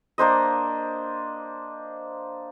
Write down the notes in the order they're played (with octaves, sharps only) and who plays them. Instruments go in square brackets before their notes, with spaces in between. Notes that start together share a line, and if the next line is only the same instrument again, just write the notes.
[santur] A#3 D4 C5 D#5